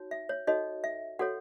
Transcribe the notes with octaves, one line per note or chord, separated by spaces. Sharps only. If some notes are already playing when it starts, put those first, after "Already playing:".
Already playing: D#4 F#4 C#5
E5
C#5
D#4 F#4 A4 C#5 D#5
E5
F#4 A4 C#5 F#5